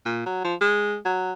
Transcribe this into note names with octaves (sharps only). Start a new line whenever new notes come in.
A#2
F#3
F3
G#3
F#3